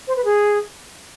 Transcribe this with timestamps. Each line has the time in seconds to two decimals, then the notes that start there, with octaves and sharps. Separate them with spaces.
0.08 C5
0.16 B4
0.25 G#4